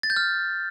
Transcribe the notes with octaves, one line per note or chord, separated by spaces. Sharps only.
A6
G6
F6